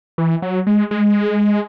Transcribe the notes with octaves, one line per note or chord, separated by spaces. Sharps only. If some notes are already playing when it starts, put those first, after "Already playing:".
E3
F#3
G#3
G#3